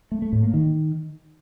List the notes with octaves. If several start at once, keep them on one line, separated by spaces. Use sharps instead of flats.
A3
A3
A2
A#3
D#3